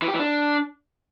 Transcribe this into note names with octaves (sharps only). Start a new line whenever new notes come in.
E3
G4
E3
D4